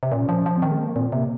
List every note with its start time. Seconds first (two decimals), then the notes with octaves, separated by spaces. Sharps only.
0.03 C3
0.12 A#2 C#4
0.29 F3
0.34 C#4
0.46 F3
0.57 C4
0.62 D#3
0.71 G#3
0.79 A#3
0.96 A#2 C4
1.12 C3 A#3